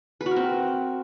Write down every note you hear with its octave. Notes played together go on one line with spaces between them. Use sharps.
B4
F#4
A#4
C4